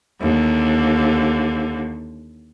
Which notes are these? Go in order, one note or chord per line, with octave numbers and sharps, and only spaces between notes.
D#2 D3